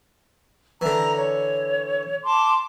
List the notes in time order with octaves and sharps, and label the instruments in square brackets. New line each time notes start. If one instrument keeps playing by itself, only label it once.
[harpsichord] D3 E3 [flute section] A#5
[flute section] C#5
A5 C6 D6